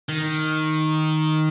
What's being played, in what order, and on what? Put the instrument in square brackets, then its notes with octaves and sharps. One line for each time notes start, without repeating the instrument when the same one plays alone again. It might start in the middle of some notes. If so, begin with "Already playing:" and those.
[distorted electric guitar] D#3